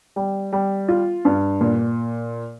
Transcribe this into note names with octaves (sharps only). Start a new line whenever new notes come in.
G3
G3
F4
G2
A#2